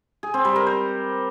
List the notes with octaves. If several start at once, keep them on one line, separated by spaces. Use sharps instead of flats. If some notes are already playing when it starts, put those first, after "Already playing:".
G#4
C4
G3
A#4
C5